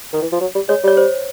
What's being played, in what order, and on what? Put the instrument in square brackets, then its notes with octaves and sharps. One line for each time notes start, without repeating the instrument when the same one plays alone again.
[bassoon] D#3
E3
F3
F#3
G3
[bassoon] G#3 [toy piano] C#5
[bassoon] G3 [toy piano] C#5
[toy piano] C5